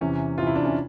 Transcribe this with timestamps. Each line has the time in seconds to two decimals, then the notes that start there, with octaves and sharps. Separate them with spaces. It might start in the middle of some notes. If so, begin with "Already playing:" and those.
0.01 E2 C3 E3 C#4
0.37 E2 C3 E3 F4
0.47 E4
0.55 D4
0.65 C#4